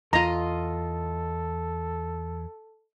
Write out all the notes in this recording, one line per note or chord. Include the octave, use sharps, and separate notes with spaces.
E2 F4 A4 D#5 A#5